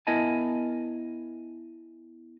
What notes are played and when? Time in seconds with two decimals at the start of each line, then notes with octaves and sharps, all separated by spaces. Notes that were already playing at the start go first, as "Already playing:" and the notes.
0.07 B3 E4 A#4 D#5 G#5 A5